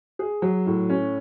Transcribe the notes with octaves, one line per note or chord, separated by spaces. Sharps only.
G#4
F#3
A2
C#4